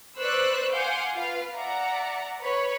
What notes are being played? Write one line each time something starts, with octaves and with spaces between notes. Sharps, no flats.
B4 C5 D5 C#6 E6 F#6
F5 F#5 G#5 C6 D6 G6
F4 B4 F5
D5 E5 F#5 A#5
B4 C#5 B5